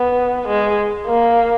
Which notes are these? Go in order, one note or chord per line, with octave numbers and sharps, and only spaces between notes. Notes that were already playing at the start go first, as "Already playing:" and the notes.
Already playing: B3
G#3
A#3